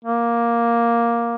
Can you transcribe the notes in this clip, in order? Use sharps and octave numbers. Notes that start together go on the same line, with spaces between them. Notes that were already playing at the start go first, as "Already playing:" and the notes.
A#3